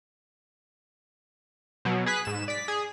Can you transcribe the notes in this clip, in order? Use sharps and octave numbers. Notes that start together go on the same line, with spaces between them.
B2 F#3
G#4 B4 F#6 B6
G#2 E7
D5 B6
G#4